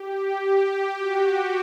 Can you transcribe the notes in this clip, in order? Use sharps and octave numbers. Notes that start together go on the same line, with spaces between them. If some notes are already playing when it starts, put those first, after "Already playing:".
Already playing: G4
G4
F#4